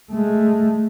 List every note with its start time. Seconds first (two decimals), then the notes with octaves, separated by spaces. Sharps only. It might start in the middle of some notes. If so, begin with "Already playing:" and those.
0.11 G#3 A3